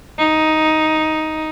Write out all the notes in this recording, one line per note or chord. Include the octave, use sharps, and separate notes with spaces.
D#4